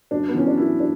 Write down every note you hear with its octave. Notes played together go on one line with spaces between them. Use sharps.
F#2 D4
B3
E3 C#4
D4
F#2 E4
D4